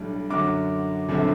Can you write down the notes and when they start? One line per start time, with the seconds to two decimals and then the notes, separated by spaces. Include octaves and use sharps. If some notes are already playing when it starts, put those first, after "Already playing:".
Already playing: B1 A2 G3 D4
0.30 F#2 D3 F#3 D6
1.09 G1 F#2 D3 A3 C4